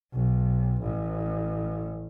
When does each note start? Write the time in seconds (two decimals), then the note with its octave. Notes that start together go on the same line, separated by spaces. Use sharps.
0.13 B1
0.82 A1